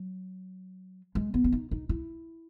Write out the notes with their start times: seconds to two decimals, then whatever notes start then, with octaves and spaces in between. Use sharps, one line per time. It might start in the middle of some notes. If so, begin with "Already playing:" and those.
Already playing: F#3
1.15 G#3
1.34 B3
1.44 C#4
1.52 D#4
1.71 D#4
1.89 E4